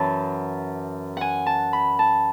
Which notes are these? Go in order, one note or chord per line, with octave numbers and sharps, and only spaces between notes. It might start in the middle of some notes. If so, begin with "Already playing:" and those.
Already playing: F#2 E3 A5
F#5 G#5
A5
B5
A5